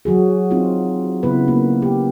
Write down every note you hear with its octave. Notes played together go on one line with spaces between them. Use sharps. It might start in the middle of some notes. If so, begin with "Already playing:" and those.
E3 F#3 F#4 G#4
C4 D#4 F4
C#3 E3 B3 E4 B4
A#3
G4